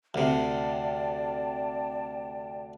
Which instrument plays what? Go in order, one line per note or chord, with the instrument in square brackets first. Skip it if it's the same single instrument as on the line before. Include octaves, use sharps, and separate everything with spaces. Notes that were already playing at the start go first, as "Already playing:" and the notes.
[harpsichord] D2 C3 [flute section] D5 G5 A5